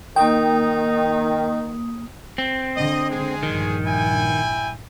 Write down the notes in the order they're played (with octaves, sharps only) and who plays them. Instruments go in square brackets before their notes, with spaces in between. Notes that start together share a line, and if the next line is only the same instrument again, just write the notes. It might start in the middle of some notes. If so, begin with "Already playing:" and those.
[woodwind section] D#3 [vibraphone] A#3 D#6 [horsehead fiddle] D#4 [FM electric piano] G5
[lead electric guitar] C4
[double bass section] D3 [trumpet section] D#5
[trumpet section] G#3 G#4
[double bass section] A#1 G2 [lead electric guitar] D#3
[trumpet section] E4 G5 G#5